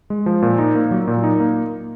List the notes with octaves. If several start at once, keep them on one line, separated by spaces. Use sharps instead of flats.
G#3
F3
A#2
D#4
A#3
F#3
A#2
D#4
A#3